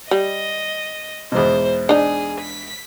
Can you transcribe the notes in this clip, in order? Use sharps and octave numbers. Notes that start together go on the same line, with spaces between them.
G3 D#5
E2 G#2 B2 C5
D4 D#4 G#4
B6